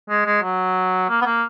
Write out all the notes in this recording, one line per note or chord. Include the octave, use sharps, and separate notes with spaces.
G#3
G#3
F#3
A#3
B3
A#3